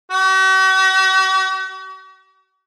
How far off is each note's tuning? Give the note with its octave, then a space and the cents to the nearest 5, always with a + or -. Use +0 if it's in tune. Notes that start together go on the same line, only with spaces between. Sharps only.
F#4 +45